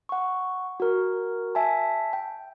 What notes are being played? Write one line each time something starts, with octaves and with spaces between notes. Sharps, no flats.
F#5 C#6
F#4 A#4
E5 G#5 A5
G5